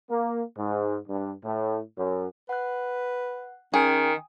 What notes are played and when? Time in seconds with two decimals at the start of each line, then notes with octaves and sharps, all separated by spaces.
0.11 A#3
0.56 G#2
1.08 G2
1.44 A2
1.97 F#2
2.49 B4 F#5 F#6
3.74 D#3 C#4 G#4 G5 G#5 D#6